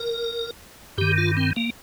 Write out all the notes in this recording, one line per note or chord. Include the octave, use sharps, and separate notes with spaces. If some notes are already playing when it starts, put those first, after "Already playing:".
Already playing: A#4
G2 D#3 G4
F4
C4
A#3